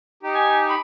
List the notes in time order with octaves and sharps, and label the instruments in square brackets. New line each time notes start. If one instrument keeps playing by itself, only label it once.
[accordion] D#4 G4
[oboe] G#5
B5